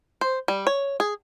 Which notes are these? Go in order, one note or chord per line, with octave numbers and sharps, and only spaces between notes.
C5
G3
C#5
G#4